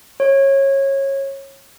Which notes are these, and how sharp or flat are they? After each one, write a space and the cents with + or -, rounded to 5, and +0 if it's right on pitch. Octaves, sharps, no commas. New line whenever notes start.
C#5 -20